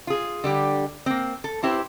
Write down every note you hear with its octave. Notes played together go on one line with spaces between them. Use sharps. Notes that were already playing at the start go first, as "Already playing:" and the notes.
F4 G#4
D3 G3 G4
A#3 C4
A4
C4 E4 G4 B4 C5